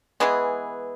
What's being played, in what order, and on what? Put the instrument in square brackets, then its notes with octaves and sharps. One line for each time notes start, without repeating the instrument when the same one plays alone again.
[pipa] E3 G#3 B3 G#4